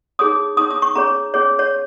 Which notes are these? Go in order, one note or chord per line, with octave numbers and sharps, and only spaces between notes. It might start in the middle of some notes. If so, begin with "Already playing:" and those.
D#4 G#4 C#5 D#6
D#4 G#4 C#5 D#6
D#6
C#6
C#4 G#4 C#5 A#5
C#4 G#4 C#5
C#5